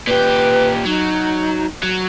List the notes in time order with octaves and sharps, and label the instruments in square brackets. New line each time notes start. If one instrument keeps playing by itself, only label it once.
[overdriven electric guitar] A#2 G4 [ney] B4
[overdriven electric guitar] F#3 [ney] D#4
[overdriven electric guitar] F#3